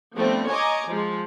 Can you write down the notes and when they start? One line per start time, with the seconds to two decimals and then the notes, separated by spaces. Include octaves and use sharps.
0.16 D3 F3 G3 A3 B3 C4
0.49 C#5 D#5 G#5 A#5 D6 G#6
0.88 F3 G#3